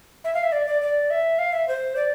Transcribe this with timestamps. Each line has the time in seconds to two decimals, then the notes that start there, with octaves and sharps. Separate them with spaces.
0.24 E5
0.34 F5
0.43 E5
0.52 D5
0.67 D5
0.82 D5
1.10 E5
1.39 F5
1.53 E5
1.68 C5
1.96 D5